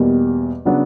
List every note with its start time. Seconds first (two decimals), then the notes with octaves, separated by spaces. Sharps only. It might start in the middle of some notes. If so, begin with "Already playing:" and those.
Already playing: E2 B2 G3 A#3
0.65 C#3 F#3 B3 D4